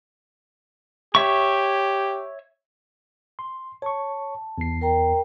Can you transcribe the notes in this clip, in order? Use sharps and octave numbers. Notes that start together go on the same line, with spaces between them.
G4 C#5 E5 C#6
C6
C#5 A5 C#6
E2 C7
A#4 G5 A#5